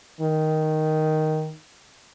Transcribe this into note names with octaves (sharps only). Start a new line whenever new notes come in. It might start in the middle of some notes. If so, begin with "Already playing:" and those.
D#3